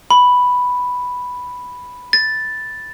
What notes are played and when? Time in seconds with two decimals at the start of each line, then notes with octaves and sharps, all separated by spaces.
0.11 B5
2.13 A6